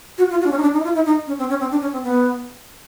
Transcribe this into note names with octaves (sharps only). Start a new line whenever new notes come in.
F#4
F4
F#4
D4
C#4
D#4
D4
D#4
E4
F4
E4
D#4
C#4
C4
C#4
C4
D4
C#4
C4
B3